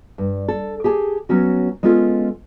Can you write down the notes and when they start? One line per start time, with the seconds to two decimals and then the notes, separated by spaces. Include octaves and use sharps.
0.18 G2
0.48 A4
0.84 G4 G#4 G#5 A5
1.29 F#3 B3 C#4 F#4
1.83 G#3 B3 C#4 F4 A4